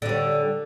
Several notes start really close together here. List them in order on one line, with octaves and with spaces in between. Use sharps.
D3 G3 C#4